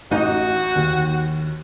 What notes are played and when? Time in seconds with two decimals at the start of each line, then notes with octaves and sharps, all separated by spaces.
0.11 A1 D#4 F#4 G6
0.76 D#2